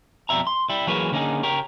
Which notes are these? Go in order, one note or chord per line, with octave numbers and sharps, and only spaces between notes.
F2 B2 G3 E5 A#5
C6
G3 E4
E3 F#3 A#3 G#4 B4 C#5
D3 G3 A#3 C#4 D#4 G#4
C#3 G4 A#4 C#5